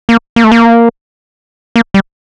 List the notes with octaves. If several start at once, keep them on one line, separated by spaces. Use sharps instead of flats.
A#3
A#3
A3
A#3
A#3
G3